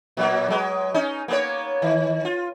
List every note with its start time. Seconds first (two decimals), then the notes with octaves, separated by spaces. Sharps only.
0.17 A#2 F#3 A#3
0.48 F#3 G#3 B4
0.94 C#4 D#4
1.28 A#3 B3 C#5
1.82 D#3
2.25 F4